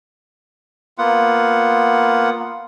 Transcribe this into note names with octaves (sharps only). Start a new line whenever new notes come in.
A#3 B3 F4 F#5